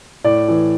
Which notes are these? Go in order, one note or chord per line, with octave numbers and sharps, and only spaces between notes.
A2 D5
E3